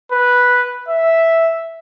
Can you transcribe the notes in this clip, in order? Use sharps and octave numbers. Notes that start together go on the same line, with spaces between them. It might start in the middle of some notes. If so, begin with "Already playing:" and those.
B4
E5